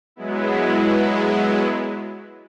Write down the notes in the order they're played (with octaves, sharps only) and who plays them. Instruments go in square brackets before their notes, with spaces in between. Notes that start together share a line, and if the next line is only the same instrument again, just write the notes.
[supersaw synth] F#3 G#3 B3 E4